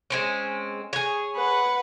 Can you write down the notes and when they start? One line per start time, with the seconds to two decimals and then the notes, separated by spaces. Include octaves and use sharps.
0.10 G#3 C4 C#4
0.93 G#4 C#5
1.35 B4 F#5